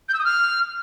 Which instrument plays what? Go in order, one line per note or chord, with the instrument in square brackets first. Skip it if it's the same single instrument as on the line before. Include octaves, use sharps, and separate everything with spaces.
[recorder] G6
E6
D#6
F6